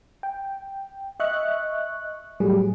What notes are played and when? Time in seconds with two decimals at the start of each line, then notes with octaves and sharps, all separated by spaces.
0.23 G5
1.20 D#5 E5 C#6 F#6
2.40 A2 F#3 G3 A3 G#4